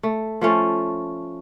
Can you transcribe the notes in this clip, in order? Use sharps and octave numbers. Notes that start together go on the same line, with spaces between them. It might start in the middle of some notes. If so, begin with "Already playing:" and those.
A3
F3 A3 C#4